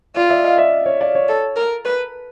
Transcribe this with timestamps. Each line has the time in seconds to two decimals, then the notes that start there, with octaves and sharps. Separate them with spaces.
0.16 F4 D5
0.29 D5 E5
0.44 D#5 F5
0.58 D5 E5
0.86 C#5
1.01 D5
1.15 C#5
1.28 A4
1.56 A#4
1.85 B4